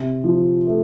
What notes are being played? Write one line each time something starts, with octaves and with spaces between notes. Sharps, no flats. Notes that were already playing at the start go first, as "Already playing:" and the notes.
Already playing: C3
F3
A3